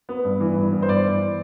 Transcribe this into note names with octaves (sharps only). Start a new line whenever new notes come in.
B3
G2
E3
G2
B3
C5
G2 D5
E3